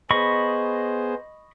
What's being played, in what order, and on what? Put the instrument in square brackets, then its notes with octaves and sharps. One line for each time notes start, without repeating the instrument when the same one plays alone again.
[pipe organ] B3 G#4 C5 [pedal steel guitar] D#5 B5 C#6